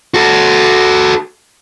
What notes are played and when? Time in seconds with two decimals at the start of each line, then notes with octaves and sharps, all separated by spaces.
0.14 F#4 A4